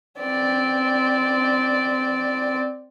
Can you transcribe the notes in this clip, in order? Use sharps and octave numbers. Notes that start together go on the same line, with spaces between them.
C4 D5